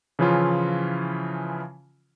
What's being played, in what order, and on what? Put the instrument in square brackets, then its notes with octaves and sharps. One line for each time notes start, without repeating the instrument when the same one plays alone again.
[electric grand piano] C#3 E3 F3 C#4 E4 F4